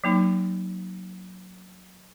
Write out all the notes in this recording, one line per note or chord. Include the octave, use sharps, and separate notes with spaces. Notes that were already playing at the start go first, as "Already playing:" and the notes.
F#3 A#3 D#4